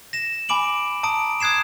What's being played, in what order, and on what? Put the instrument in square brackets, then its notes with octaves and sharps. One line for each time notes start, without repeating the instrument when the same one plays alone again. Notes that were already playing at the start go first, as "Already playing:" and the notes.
[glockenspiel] A#6 E7
G#5 B5 D6 D7 F#7
A5 A#5 D#6 D7
D#6 F#6 G#6 C7 E7